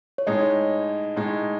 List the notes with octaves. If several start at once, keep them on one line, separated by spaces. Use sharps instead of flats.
C#5
A2 G#3 D#4 D#5
A2 G#3 D#4